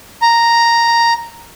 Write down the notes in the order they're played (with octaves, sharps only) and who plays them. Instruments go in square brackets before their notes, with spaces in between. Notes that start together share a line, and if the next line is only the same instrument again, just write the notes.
[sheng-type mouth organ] A#5